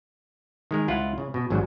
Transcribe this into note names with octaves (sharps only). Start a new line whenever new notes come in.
D#3 G#3 A#4
C#2 E4 F4 F#5
C#3
B2
G#1 G#2 F#3 G3